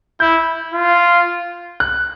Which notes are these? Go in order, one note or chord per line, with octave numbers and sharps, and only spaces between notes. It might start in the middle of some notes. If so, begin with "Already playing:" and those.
E4 G6
F4
F#6